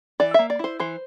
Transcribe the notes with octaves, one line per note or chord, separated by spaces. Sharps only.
E3 D5
A#3 E5
D5
E4 C5
E3 C5